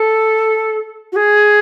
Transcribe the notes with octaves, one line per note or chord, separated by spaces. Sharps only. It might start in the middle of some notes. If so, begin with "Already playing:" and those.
Already playing: A4
F#4
G#4